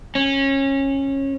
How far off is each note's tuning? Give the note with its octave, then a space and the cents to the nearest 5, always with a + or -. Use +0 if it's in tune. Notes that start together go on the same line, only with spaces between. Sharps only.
C#4 -20